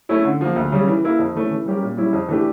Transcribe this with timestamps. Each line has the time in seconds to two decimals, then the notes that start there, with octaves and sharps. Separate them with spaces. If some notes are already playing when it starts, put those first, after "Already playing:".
0.09 A3 C#4 E4
0.25 D3
0.41 F3 A#3
0.56 D2
0.72 C#3 G3 C#4
0.87 E3
1.04 A#3 E4 A#4
1.19 F2
1.35 E3 A3 C#4
1.51 E3
1.66 G3 C#4 G4 A#4
1.83 A#2
1.97 G3 C#4 E4
2.13 F2
2.29 E3 A3 D4 G4